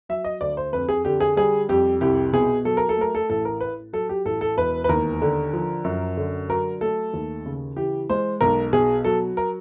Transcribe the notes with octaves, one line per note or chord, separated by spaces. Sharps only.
F#3 E5
D#5
D2 D5
C5
F2 B4
G#4
D3 G4
G#4
G3 G#4
F2 G4
C2 G4
B2 G#4
F#3 A4
A#4
A4
A3 A#4
A4
A1 A4
A#4
A2 B4
F#3 A4
G4
A1 A4
A4
E1 B4
B4
D#2 A#4
D3
F3
F#2
D3
F#3 A#4
A3 A4
D#2
C#3
E3 G4
G#3 C5
B1 A#4
B2 G#4
F#3 A4
A#4